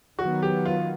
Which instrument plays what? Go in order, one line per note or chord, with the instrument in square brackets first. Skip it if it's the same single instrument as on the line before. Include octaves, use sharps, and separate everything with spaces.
[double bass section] D#3 F#3 B3 [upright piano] F#4
[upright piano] G4
F4